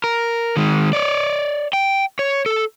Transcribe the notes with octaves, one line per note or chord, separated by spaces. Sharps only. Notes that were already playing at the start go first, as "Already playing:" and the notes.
A#4
D#3 G#3
C#5 D5
G5
C#5
A4